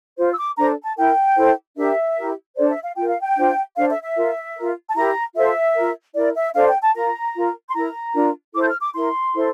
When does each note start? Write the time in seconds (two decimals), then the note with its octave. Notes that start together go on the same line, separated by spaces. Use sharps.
0.17 F4 C5
0.32 E6
0.37 D6
0.57 D4 A4 C5 A#5
0.84 A5
0.97 E4 A#4 G5
1.37 E4 A4 C5
1.76 D4 G4 A#4 E5
2.16 E4 G4 A#4
2.57 D4 A4 C5 D5
2.70 E5
2.83 F5
2.96 F4 A#4 G5
3.08 F5
3.21 G5
3.36 D4 F4 C5
3.76 D4 A4 C5 F5
3.90 E5
4.03 E5
4.15 F4 A#4
4.56 A#4
4.61 F4
4.90 A5
4.95 E4 G4 A#4 A#5
5.35 F4 A4 C5 E5
5.75 F4 A#4
6.16 E4 A#4 D5
6.35 E5
6.55 D4 A4 C5 F5
6.68 G5
6.82 A5
6.95 F4 A#4 A#5
7.35 F4 A#4
7.68 C6
7.75 E4 A#4 A#5
8.15 D4 F4 A#4
8.54 E4 A4 C5 D6
8.62 G6
8.68 F6
8.81 D6
8.94 E4 A#4 C6
9.34 E4 A4 C5